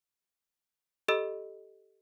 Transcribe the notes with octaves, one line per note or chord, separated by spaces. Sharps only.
G4 A4 D#5 B5 E6